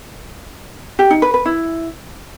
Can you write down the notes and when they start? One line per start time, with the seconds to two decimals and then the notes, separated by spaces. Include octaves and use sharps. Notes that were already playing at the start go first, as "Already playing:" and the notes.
0.99 G4
1.10 D#4
1.22 B4
1.34 B4
1.45 E4